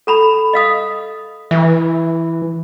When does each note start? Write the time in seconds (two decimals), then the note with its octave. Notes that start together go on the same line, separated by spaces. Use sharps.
0.07 A4 A#5 B5
0.53 D#5 F5 D#6
1.51 E3 E5